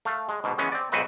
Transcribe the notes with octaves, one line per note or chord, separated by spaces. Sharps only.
A3 F5
G#3
G#2 B2
E3 G#3 B3 C#4
C4 D5
B1 G#2 C4 F#4 B4 D#5